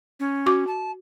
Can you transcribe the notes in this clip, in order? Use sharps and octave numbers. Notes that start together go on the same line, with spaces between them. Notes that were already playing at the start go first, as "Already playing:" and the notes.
C#4
F#4 D6
A5